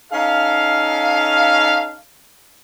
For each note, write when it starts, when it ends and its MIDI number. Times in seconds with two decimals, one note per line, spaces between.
0.11 1.95 61
0.11 1.95 63
0.11 1.95 69
0.11 1.95 77